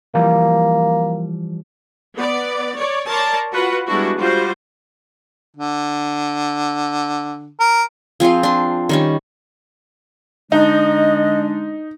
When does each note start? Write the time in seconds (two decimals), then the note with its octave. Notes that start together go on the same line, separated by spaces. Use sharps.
0.15 E3 F3 G3 A#3
2.16 B3 D5
2.76 C#5 D5
3.08 A#4 C#5 D5 A5 A#5 C6
3.53 F4 F#4 B4 F#5
3.87 G3 G#3 B3 D4 E4 F#4
4.18 G3 F4 F#4 C5
5.57 D3
7.60 A#4
8.20 F3 C4 G#4 F5
8.43 D4 C6
8.89 D#3 G3 C#4
10.52 D3 G#3 D4 D#4 D#5